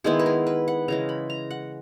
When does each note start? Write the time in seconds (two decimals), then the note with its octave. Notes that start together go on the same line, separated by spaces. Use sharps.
0.04 D#3 G#3 B3 E4 G#4
0.19 B4
0.26 A#4
0.47 B4
0.68 F#5
0.88 C#3 E3 G#3 A#5
1.09 B5
1.30 A#5
1.51 F#5